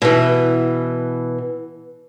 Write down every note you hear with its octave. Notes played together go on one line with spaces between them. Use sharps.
B2 E3